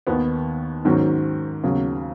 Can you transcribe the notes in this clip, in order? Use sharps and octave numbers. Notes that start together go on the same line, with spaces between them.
D#2 D#3 B3
G#2 D#3 F#3 C#4 F#4
D#2 C#3 F#3